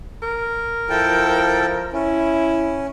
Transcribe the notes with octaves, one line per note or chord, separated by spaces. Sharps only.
A#4
F3 E4 A4 G5
C#4 E4